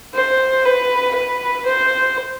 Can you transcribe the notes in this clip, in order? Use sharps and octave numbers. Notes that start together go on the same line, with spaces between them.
C5
B4
B4
C5